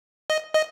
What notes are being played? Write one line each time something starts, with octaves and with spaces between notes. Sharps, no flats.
D#5
D#5